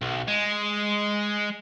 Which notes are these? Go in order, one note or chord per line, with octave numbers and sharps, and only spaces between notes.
B1
G#3